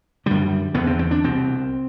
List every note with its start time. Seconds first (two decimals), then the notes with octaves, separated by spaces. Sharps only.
0.26 F#2 D3 G3
0.74 E2 D3 B3
0.87 C4
0.99 C4
1.11 D4
1.24 C2 B2 C4